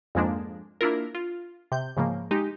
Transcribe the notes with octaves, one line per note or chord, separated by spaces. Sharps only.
F2 G#2 F3 G#3 A#3 D4
A#3 D4 E4 F4 A#4
F4
C3 G6
G#2 C#3 F3 A#3
G#3 D#4 G4